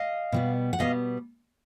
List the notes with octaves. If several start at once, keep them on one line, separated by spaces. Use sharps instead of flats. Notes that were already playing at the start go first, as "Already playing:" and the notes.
Already playing: D#5 F5
B2 G3 B3
F#5
B2 G3 B3 D#5 F5